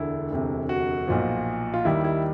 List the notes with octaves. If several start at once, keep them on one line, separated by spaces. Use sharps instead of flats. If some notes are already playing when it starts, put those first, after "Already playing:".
Already playing: E1 D2 D3 E4
E1 D2 C3
F#4
B1 A#2 F3
F4
D#2 D#3 G3 E4
E4